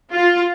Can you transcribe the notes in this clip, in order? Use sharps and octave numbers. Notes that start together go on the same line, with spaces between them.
F4